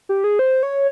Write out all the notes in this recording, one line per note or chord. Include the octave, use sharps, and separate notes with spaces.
G4
G#4
C5
C#5